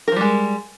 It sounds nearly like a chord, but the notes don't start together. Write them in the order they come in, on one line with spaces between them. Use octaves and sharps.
A#4 F3 G3 G#3